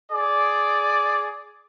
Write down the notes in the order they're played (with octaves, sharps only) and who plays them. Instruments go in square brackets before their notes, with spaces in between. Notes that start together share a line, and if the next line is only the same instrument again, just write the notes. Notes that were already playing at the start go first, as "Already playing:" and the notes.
[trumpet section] G#4 D5